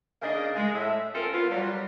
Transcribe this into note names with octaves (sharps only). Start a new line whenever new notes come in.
C#3 A#3 D4 G#4 D#5
G#3
A2 E5
C4 C#4 F4 A4 A#4
B3 F4
F#3 G3